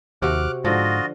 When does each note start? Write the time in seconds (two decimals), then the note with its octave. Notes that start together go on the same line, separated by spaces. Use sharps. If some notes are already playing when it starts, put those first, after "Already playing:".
0.22 D#2 C3 F#4 D6 F6 F#6
0.65 G#2 D3 F3 F4 F#4 D#5